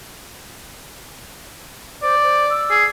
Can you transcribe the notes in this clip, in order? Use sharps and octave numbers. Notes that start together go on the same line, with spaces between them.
C5 D5
C5
E6
G#4